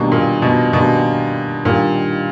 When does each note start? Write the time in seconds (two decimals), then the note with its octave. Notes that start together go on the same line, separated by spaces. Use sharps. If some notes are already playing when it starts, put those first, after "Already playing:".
Already playing: B2 D#3 G3 A#3 D4
0.12 A#2
0.42 B2
0.73 B2 D#3 G3 A#3 D4
1.65 A#2 D#3 G3 A#3 D4